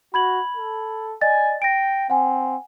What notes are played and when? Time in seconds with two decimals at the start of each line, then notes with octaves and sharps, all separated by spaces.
0.14 F#4 B5 G#6 F#7
0.57 A4
1.22 D5 D#5 G#5 A6
1.62 G5 A#6 D7
2.10 C4 F#5 G#5